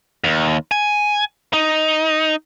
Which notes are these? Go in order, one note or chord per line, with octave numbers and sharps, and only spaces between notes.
D#2
G#5
D#4